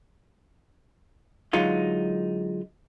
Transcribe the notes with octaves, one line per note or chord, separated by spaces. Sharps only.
D3 F#3 G#3 D#4 F4